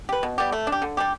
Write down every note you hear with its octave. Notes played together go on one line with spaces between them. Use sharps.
G4 B4
B2
G3 B3 G4
A3
D4
G4
D3
G3 D4 G4